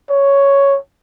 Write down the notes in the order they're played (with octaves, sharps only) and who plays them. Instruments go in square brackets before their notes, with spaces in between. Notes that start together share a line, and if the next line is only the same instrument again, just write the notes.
[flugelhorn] C#5